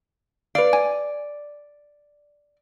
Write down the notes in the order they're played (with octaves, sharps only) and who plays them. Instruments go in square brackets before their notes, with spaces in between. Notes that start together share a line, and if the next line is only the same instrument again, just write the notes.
[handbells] B4 F5 [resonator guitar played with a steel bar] D5
[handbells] G#5